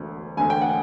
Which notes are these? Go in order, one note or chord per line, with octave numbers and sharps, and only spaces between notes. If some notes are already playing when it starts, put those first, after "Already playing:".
Already playing: E1 D2 D3
E1 D2 D3 G#5
G5
F#5